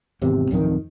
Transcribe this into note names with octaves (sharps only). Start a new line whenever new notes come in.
G#1 E2 C3
D1 F2 D#3